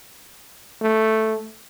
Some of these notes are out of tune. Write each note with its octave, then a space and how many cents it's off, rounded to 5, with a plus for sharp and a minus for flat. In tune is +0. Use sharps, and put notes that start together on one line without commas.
A3 +0